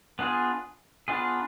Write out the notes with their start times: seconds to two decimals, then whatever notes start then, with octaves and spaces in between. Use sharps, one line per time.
0.19 B3 D4 F4 G#4
1.08 B3 D4 F4 G#4